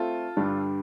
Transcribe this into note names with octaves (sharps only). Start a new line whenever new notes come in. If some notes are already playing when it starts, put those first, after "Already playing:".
Already playing: A3 C4 F4 A4
G2 D3 G3 D4